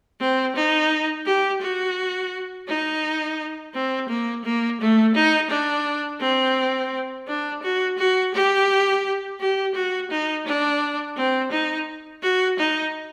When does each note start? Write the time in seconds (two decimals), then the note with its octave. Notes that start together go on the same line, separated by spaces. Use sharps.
0.20 C4
0.56 D#4
1.26 G4
1.61 F#4
2.68 D#4
3.74 C4
4.09 A#3
4.44 A#3
4.80 A3
5.15 D#4
5.50 D4
6.21 C4
7.27 D4
7.62 F#4
7.98 F#4
8.34 G4
9.40 G4
9.75 F#4
10.11 D#4
10.46 D4
11.16 C4
11.52 D#4
12.23 F#4
12.59 D#4